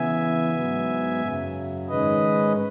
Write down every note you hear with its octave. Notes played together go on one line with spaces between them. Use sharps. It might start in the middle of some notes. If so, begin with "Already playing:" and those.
Already playing: C#3 E3 B3 E5 G#5
G#2 F#3 B3
F#2 C#3 F#3
G#2 D#3 G#3 C#4 B4 D#5